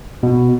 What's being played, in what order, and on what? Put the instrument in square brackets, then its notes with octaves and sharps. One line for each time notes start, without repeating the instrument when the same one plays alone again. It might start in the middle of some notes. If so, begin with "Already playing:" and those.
[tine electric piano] B2